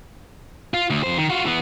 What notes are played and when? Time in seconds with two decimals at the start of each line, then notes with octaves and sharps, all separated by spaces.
0.74 F4
0.90 D2
1.03 F2 C5
1.18 D#3
1.30 F4 F#4
1.46 E3 B3